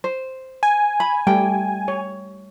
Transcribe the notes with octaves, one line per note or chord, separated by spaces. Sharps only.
C5
G#5
B5
G3 A3 G5
C#5